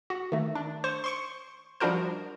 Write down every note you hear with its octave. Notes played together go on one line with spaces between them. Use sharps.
F#4
D#3 A3
D4
C5 C#6
C6 C#6 C#7
F3 G3 D4 F#4 A#4 C5